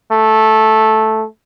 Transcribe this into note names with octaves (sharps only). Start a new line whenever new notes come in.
A3